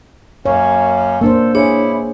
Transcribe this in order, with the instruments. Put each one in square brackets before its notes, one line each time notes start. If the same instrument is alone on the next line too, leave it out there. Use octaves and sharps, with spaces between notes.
[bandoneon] F#2 A#3 C#4 [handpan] C#5
[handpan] A#3 D4 C5 [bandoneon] A4
[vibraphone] D4 C#5 [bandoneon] E4 [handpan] G#4